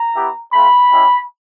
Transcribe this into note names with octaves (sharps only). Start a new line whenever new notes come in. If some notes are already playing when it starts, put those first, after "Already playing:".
Already playing: A#5
B3 E4 G4
A3 C4 F4 B5
G#3 C#4 E4 G4